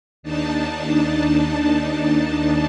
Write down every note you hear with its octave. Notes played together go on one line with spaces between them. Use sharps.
D#2 D4 D#4 A5